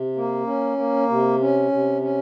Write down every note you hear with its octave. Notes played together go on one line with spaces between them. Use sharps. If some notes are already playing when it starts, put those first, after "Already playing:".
Already playing: C3
A#3
C#4
A#3
C3
C#4
C3
C#4